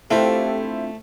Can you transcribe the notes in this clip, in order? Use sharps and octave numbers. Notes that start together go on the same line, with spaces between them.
A3 C4 D4 E4 F4 G4 A4 C5